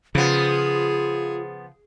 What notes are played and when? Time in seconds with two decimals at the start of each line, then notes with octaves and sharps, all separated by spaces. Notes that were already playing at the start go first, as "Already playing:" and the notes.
0.15 C#3 F3 B3 F4 G#4